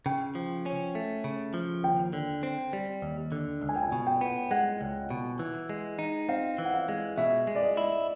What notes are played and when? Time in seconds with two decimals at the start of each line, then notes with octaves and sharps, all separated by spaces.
0.06 C#3 G5
0.35 F3
0.66 C#4
0.95 A3
1.24 C#3
1.54 F3
1.84 D#2 G5
2.13 D3
2.43 C4
2.73 G3
3.02 D#2
3.32 D3
3.62 C#2
3.69 G#5
3.76 G5
3.83 G#5
3.92 B2
4.07 G5
4.21 B3
4.51 G#3 F#5
4.81 C#2
5.10 B2
5.39 E3
5.69 G#3
5.99 D#4
6.29 C4 F5
6.58 E3
6.65 F#5
6.74 F5
6.89 G#3
7.17 B2 E5
7.47 G#3
7.55 D5
7.63 D#5
7.77 E4